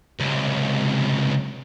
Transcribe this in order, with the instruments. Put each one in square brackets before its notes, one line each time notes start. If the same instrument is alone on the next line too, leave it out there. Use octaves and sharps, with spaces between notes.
[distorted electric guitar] C#2 C3